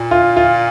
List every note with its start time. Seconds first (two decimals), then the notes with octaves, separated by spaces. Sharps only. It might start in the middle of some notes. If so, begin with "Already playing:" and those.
Already playing: A#2
0.11 F4
0.37 F4